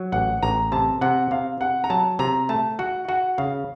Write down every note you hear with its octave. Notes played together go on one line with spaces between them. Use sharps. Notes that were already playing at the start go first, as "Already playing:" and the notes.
Already playing: F#3
A1 F#5
A1 A#5
C3 A5
C3 F#5
C3 F5
C3 F#5
A#5
F#3 A5
C3 A#5
A3 A5
F#4 F#5
F#4 F#5
C#3 F5